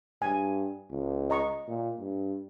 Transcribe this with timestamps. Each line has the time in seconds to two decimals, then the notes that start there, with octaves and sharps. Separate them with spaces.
0.22 G2 G#5
0.90 C#2
1.30 D#5 A#5 C#6
1.68 A#2
1.99 G2